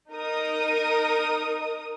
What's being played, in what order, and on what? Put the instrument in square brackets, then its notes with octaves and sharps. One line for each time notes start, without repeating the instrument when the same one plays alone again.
[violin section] D#4 A#4 D#6